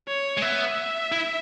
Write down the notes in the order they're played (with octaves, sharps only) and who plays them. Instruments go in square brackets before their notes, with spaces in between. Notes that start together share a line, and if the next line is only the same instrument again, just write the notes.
[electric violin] C#5
[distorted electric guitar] G#3
[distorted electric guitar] B3 [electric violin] E5
[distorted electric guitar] E4